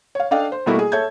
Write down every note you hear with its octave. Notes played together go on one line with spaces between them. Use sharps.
C#5 F5
D4 A4 D#5 F5 G5
C5
B2 G3 A3 A#3 E4 F#4
G#4
A4 C#5 E5 G6 G#6